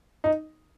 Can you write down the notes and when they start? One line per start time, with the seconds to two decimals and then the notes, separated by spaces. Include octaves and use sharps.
0.24 D#4